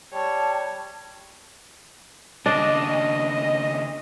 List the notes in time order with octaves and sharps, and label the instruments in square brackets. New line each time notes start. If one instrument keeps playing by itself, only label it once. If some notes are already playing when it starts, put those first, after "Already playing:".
[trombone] G3 [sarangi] C#5 [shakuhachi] A5
[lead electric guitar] D#2 C#3 [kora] D4 D5 [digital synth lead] D#5